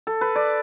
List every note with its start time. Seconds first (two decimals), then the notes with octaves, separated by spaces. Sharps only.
0.07 A4
0.21 B4
0.36 D5